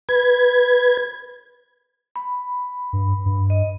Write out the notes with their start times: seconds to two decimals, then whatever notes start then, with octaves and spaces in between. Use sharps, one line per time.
0.09 B4 G#6
2.16 B5
2.93 G2
3.26 G2
3.50 D#5